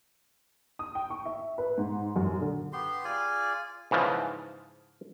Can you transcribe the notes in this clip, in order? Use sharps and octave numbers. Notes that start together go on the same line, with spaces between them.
D#6
G5
C#6
E5
B4
G#2
F#2
D3
B3 G4 C6
F4 G#4 D5 G#5
G#2 C#3 E3 F3